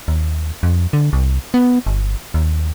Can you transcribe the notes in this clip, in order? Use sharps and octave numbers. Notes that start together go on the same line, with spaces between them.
D#2
F2
D3
C2
B3
G1
D#2